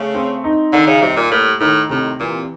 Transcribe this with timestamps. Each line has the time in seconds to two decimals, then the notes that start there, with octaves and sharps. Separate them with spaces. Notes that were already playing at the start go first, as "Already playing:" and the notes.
Already playing: C#3 A3
0.14 C4
0.44 D#4
0.73 D3 D#3
0.87 C#3
1.02 C3 G3
1.16 A#2
1.31 A2 A#3
1.60 A2 D#3
1.90 A2 C3
2.20 A#2 E3